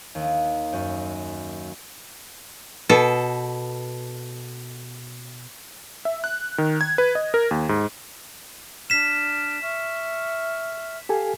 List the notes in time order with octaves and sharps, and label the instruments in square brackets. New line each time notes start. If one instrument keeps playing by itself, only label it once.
[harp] D#2
F#2
[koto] B2 A4
[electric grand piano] E5
F#6
D#3
G#6
B4
D#5
A#4
D#2
G#2
[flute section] D4 F6 [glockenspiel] B6 E7
[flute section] E5 C#6 F6
[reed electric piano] G4 A4 G#5 [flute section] F5